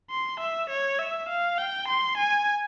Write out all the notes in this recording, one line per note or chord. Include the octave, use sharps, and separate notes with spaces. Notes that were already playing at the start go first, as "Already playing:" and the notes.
C6
E5
C#5
E5
F5
G5
C6
G#5